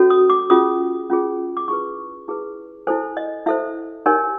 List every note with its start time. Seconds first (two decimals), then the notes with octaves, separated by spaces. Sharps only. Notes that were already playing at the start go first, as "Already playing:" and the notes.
Already playing: C#4 F#4 A4 C#5
0.10 D#6
0.30 D6
0.50 C#4 F4 G#4 D#6
1.10 C#4 F4 G#4
1.57 D6
1.68 E4 G#4 B4 C#6
2.28 E4 G#4 B4
2.87 E4 A4 C5 G#5
3.17 D#5
3.46 E4 A4 C5 E5
4.06 D#4 G4 A#4 C#5 G#5